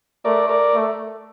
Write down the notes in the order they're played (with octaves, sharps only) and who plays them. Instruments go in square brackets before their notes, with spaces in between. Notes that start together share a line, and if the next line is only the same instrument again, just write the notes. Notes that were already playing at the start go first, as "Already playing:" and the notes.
[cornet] A3 [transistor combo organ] A#4 D5
[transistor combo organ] A#4 D5
[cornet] A3